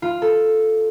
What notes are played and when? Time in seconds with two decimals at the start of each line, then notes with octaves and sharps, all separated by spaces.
0.02 F4
0.22 A4